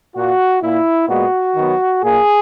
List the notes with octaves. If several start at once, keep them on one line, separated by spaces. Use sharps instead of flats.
A#2 A#3 F#4
A#2 A#3 E4
A#2 G#3 B3 F#4
D#3 F#3 B3
A#2 A#3 G#4